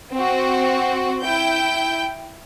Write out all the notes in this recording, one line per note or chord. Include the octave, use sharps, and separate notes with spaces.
C4 F#4
E4 G5 G6